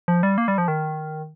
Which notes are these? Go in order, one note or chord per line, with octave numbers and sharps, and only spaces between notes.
F3
G3
A#3
G3
F3
D#3